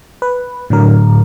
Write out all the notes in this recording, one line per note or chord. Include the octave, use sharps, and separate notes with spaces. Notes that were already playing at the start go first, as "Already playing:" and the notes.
B4
A2 D3 F#3 A#4